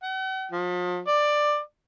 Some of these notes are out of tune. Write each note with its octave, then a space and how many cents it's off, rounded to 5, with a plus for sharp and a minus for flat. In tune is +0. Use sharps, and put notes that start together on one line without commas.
F#5 +45
F3 +40
D5 +15